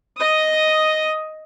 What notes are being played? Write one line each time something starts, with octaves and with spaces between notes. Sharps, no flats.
D#5 D#6